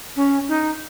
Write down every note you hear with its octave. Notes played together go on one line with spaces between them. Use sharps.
C#4
D#4